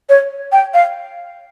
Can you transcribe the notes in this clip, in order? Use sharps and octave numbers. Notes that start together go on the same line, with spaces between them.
C#5
G5
F5